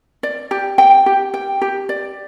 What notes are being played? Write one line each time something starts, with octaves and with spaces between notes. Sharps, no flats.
D5
G4
G5
G4
G5
G4
D5